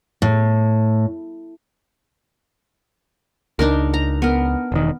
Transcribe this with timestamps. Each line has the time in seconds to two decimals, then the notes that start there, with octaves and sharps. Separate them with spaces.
0.22 A2
3.59 C#2 D4 D#4 A#4
3.94 A#5
4.22 B3 A#4
4.72 E1 D#3